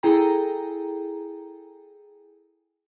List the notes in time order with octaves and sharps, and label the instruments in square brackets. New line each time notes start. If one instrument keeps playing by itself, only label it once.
[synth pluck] E4 G#4 A4 G5 A#5